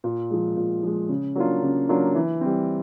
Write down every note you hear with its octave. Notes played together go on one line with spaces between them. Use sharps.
A#2
F3 G#3
A#2
F3 G#3
C#3
F#3 A#3 D4 F4
C#3
F#3 A#3 D4 F4
E3
G3 C4